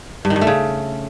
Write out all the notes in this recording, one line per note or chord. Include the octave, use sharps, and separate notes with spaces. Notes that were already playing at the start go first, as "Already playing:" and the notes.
G2
D#3
G2
A3
C#3